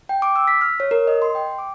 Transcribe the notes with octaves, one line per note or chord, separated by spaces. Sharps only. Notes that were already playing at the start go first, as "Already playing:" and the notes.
G5
D6
E6
B6
F6
C#5
A#4
D#5
C6
G5
D6